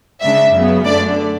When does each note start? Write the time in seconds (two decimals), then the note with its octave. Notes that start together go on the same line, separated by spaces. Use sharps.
0.21 C#3 G#3 D4 E5
0.53 F#2 C#3 F#3 B3
0.85 F#2 D3 A3 D4 D5